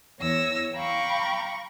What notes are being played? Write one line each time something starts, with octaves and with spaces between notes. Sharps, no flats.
E2 E3 C#5 E6 A#6
F5 G5 A#5 B5 C#6 D6